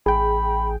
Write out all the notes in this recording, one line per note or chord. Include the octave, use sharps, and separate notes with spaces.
A1 G#4 G5 B5